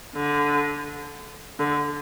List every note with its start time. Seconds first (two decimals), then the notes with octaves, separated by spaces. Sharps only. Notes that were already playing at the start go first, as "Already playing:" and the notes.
0.15 D3
1.59 D3